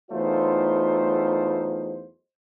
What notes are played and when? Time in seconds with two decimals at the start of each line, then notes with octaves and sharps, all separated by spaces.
0.11 E2 F#3 A3 D#4 F4 C5